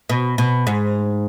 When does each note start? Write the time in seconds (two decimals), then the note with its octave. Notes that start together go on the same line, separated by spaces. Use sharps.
0.09 B2
0.38 B2
0.67 G#2